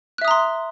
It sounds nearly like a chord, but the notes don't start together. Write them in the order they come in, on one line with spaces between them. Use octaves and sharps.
F#6 E5 D#6 A#5 C6